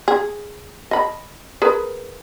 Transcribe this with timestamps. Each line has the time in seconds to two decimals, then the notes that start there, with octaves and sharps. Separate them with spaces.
0.08 G#4
0.91 D#5 B5
1.62 G#4 A#4 B4